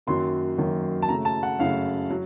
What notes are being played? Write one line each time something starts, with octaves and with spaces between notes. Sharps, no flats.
F#2 D#3 F#3 A#3 C6
F#2 D#3 F#3 A#3
A5
F#2 C#3 A3 A#5
A5
F#5
F#2 C#3 A3 F5
F#3